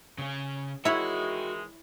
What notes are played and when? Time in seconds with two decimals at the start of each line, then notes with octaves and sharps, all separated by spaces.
0.18 C#3 C#4
0.85 D#3 E3 G#3 E4 F#4 C#5